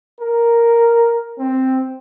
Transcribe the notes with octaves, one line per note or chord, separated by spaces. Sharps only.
A#4
C4